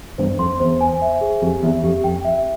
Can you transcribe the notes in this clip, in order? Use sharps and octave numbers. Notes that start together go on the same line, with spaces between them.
E2 G2 C5
F2 C6
E2 C5
G#5
E5
G#4
F2 G4
E2 E5
F2 G4
F2 G5
E5